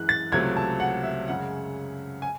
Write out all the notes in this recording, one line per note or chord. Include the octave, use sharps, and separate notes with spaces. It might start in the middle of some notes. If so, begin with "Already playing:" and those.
Already playing: F#2 E3 G#3 F#6
A6
C#2 C3 F#3 A3 G#6
A5
F#5
E5
F#2 C#3 G#3 F#5
G#5